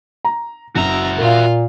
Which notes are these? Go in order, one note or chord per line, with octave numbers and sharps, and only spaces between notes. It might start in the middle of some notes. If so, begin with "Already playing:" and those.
A#5
F#1 F#4 E5 A#5
A#2 F4 A#4 F5